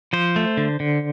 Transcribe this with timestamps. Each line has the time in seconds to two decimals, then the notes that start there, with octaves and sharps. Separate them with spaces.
0.13 F3 C5
0.36 A3
0.57 D3
0.80 D3